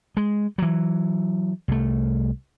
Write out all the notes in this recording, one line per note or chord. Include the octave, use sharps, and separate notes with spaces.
G#3
E3 F#3
C2 A3